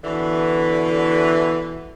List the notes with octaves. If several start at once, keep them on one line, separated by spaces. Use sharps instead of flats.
B2 D3 E3